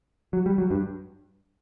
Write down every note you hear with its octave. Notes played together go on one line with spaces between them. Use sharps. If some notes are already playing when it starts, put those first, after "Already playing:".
F#3
G3
F#3
G2